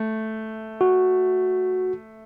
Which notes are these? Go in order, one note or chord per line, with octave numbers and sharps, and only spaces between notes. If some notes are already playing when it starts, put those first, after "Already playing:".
Already playing: A3
F#4